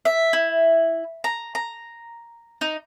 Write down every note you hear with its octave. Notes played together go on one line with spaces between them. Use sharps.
E5
E4
A#5
A#5
D#4